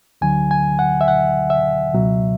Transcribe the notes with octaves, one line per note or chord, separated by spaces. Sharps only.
D2 D3 F#3 G#5
G#5
F#5
E5
F#5
E5
C#2 B2 F#3